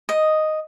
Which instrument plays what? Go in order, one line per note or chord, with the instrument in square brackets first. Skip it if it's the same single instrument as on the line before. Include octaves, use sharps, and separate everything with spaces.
[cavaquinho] D#5